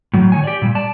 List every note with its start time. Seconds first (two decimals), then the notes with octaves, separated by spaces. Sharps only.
0.14 A2 F#3
0.32 D#3 C#5 G#5
0.44 G4 D5
0.62 A#2 G3
0.75 D5 A5